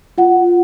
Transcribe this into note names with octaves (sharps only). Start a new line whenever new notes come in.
F4 F#5